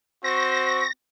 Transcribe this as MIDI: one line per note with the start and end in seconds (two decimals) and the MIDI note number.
0.24 0.84 60
0.24 0.84 66
0.24 0.84 72
0.24 0.87 85
0.24 0.93 94